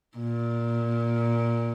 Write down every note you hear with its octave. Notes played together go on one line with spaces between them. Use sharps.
A#2